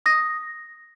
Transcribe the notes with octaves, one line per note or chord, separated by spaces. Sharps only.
D#6 A#6